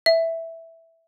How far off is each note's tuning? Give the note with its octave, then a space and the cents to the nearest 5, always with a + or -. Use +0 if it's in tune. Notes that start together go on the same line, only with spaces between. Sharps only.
E5 -5